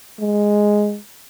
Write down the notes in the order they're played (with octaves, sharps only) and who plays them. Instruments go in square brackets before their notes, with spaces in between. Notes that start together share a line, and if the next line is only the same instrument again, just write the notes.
[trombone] G#3